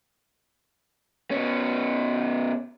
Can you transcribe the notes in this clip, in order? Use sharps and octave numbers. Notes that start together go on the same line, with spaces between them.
B2 C#4